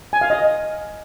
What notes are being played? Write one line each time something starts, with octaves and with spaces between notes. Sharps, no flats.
G#5
F5
D#5